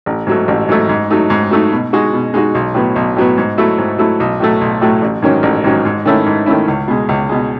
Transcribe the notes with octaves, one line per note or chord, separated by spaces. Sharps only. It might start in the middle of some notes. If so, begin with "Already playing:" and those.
A1
G#2 F#3 A3
A1
G#2 F#3 A3
G#2
F#3 A3 D#4
G#2
F#3 A3 D#4
B2
G#3 D#4 F#4
B2
G#3 D#4 F#4
B1
A2 F#3 B3
B1
A2 F#3 B3
G#2
F#3 A3 E4
G#2
F#3 A3 E4
B1
A2 F#3 A3
B1
A2 F#3 A3
A1
G#2 D#3 F#3 C#4
A1
G#2 D#3 F#3 C#4
G#2
D#3 A3 C#4 E4
G#2
D#3 A3 C#4 E4
C#2
B2 G#3
C#2
B2 G#3